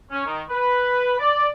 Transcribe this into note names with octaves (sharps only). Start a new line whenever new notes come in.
C#4
D#3
B4
D5